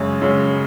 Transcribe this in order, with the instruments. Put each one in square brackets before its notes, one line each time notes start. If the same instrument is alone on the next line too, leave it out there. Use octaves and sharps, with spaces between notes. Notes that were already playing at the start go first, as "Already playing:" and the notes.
Already playing: [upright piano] F#2 C#3 G#3 C#4
F#2 C#3 G#3 C#4